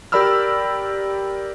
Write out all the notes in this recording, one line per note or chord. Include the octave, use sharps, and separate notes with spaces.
G4 A#4 D5 B5 E6 F6